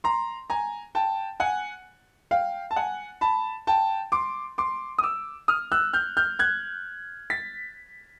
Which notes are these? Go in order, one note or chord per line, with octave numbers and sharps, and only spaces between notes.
A#5 C6
G#5 A#5
G5 A5
F#5 G#5
F5 G5
A5
F#5 G#5
A5 B5
G5 A5
C6 D6
C6 D6
D#6
D6 E6
D#6 F6
E6 F#6
F6 G6
F6 G6
F#6 G#6
A6 B6